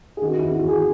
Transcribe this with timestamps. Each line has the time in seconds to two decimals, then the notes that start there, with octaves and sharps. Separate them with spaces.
0.17 G#4
0.21 D#3 F#4
0.37 E4
0.42 E2
0.52 F#4
0.62 E2
0.68 G#4